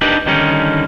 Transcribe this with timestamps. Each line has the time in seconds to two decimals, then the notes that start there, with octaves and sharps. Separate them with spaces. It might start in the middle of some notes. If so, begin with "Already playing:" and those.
0.01 D4 D#4 G4 A#4 B4 D5
0.26 D3 D#3 G3 C#4 D#4